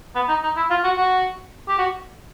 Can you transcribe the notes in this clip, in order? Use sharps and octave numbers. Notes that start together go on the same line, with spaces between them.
B3
D#4
D#4
E4
F4
F#4
F#4
G4
F#4